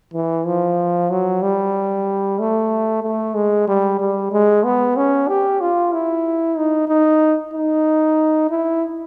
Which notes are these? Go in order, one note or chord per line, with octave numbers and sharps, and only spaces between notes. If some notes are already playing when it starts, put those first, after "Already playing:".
E3
F3
F#3
G3
A3
A3
G#3
G3
G3
G#3
B3
C#4
G4
F4
E4
D#4
D#4
D#4
E4